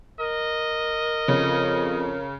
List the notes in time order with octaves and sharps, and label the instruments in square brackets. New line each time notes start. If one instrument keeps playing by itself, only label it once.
[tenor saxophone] A#4 [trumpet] D#5
[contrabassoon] F2 [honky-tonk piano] C#3